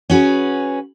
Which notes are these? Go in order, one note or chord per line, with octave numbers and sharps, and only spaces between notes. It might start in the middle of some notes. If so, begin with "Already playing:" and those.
C#4 F#4 G#4 B4